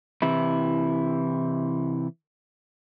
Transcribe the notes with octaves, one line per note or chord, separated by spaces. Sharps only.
C3 E3 E4